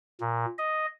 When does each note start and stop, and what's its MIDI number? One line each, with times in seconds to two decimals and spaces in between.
0.21 0.46 46
0.58 0.86 75